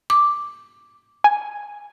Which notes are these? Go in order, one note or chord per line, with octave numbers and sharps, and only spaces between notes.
D6
G#5